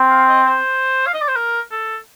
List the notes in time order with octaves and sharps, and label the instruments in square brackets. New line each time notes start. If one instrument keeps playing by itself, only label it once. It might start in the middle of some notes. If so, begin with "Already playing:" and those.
Already playing: [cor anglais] C4
[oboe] F5
D#5
C5
F5
D#5
D5
C5
A#4
A4